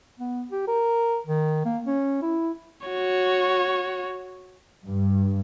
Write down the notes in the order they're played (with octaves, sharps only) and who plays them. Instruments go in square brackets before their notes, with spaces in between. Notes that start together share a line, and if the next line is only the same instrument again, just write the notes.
[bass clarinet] B3
G4
A#4
D#3
A#3
C#4
E4
[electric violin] F#4 C#5
[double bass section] G2